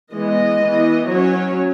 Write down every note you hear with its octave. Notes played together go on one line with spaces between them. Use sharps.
E3 G#3 B3 D#5
E3 B3
F#3 C#4 C#5